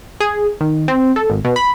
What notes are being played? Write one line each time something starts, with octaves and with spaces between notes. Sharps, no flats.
G#4
D#3
C4
A4
G#1
B2
B5